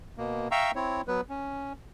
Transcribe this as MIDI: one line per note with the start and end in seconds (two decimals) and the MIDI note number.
0.18 0.48 47
0.18 0.48 58
0.51 0.71 76
0.51 0.71 77
0.51 0.71 79
0.51 0.71 82
0.51 0.71 85
0.51 0.71 88
0.75 1.01 60
0.75 1.01 64
0.75 1.01 73
1.08 1.21 54
1.08 1.21 59
1.08 1.21 71
1.30 1.73 61